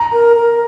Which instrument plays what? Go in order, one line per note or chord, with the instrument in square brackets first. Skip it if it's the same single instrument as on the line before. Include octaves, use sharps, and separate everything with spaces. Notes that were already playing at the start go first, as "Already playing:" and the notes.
Already playing: [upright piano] A#5
[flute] A#4
A#4